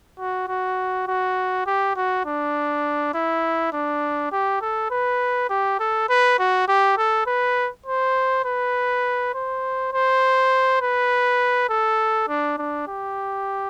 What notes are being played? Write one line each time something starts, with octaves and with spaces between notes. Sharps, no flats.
F#4
F#4
F#4
G4
F#4
D4
E4
D4
G4
A4
B4
G4
A4
B4
F#4
G4
A4
B4
C5
B4
C5
C5
B4
A4
D4
D4
G4